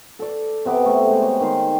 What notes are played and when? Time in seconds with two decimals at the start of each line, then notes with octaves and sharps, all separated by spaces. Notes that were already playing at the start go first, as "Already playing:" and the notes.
0.19 A4 D5
0.66 C3 B3 D6
0.86 A3 A4
1.07 G#3 G5
1.22 C#5
1.41 D#3 G4 C6